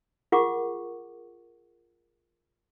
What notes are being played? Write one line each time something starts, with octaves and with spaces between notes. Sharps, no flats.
F4 G#4 A#4 F#5 C#6 D6